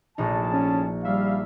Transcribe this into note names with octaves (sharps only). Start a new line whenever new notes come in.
A#1 A2 D#4 G#4 A5
C#4
G3 E5 F5